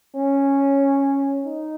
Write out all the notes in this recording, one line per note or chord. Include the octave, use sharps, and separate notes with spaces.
C#4
D#4